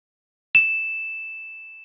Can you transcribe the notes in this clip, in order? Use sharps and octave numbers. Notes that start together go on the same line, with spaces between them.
E7